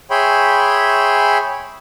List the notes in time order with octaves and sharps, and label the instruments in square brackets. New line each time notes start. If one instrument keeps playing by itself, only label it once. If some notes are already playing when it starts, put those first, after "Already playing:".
[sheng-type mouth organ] G#4 C#5 E5 G5 B5 C6